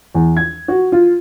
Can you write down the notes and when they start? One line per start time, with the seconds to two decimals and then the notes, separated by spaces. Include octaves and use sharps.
0.15 E2
0.37 G#6
0.68 F#4
0.92 F4